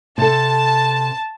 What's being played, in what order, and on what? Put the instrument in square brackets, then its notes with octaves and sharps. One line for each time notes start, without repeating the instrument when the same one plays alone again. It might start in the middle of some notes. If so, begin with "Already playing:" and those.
[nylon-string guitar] C3 A4 [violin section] A5